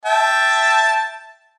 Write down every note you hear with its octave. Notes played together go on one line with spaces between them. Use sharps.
E5 G5 A5